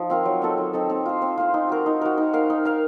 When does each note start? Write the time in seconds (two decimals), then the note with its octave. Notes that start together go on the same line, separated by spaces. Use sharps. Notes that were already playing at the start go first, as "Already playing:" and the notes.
Already playing: F3 D#4
0.10 C4 F4 A#4
0.25 F#3
0.42 C4 D#4 A4
0.58 F#3
0.73 C4 D#4 A4
0.90 C4
1.06 F4 C5
1.22 C4
1.37 F4 C5
1.54 D#4
1.69 F#4 A#4
1.86 D#4
2.01 F#4 A#4
2.18 D#4
2.33 A#4 F5
2.50 D#4
2.65 A#4 F5